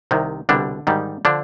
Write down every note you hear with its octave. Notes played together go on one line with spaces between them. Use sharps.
C2 C3 D#3
C2 B2 D3 G3 D4
G#2 D#3 G3
D3 F3 D4